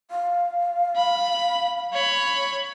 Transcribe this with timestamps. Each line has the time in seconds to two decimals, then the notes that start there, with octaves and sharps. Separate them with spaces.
0.11 F5
0.96 B5
1.93 C#5 B5